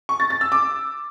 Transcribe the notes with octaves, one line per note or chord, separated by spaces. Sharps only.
C#6
A6
A6
E6
D6